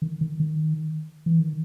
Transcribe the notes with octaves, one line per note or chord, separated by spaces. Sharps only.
D#3
D#3
D#3
E3
D#3